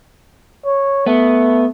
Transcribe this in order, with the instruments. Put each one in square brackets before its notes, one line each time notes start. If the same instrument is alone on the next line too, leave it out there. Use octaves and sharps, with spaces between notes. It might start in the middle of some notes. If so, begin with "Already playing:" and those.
[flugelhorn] C#5
[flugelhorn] A3 [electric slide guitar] B3